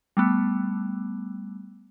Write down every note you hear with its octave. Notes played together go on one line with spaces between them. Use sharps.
G3 A3 B3